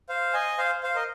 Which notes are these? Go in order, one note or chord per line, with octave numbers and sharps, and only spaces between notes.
C5 F5
D#5 G#5
C5 F5
C5 F5
A#4 D#5